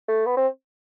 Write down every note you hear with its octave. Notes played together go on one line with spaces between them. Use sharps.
A3
B3
C4